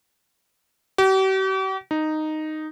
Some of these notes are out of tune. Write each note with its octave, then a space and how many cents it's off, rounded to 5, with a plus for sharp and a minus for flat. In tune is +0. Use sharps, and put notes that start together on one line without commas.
G4 -45
D#4 -5